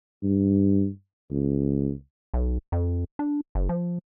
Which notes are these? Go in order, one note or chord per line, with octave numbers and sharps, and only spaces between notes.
G2
C#2
B1
F2
D4
F#1
F3